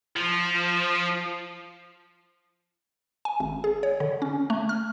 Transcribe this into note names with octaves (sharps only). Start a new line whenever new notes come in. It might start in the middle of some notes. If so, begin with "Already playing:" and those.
F3
G#5
G#1
G#4
C#5
D3
C#4
A3
F6